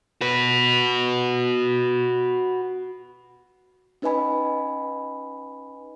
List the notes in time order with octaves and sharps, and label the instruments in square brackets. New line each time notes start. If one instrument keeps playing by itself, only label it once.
[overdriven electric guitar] F#4 B4
[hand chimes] C#4 D#4 B4 D#5 G#5 B5